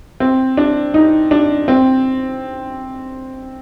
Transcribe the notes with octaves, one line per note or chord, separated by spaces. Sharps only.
C4
D4
D#4
D4
C4